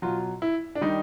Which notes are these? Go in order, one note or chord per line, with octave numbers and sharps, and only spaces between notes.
B2 F#3 F4
E4
D4
D#3 G3 D#4